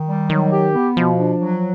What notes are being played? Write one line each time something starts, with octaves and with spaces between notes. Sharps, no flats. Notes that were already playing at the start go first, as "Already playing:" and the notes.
Already playing: D#3
G3
D#3 F#3
G4
B3
B2 F3
D4
F#3